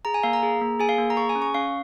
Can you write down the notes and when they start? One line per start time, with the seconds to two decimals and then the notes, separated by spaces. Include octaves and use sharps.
0.05 G#4 A#5
0.14 G#5
0.23 A#3 F5
0.33 A#5
0.43 G#4
0.61 A#3
0.80 G#4 G#5
0.89 F5
0.98 A#3
1.10 A#5
1.17 G#4 C#6
1.29 G#5
1.35 C#4
1.42 C#6
1.54 C#4 F5